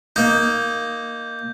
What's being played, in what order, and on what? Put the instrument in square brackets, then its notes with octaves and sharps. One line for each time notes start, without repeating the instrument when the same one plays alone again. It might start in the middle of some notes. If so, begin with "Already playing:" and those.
[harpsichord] A#3 D#4 [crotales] G6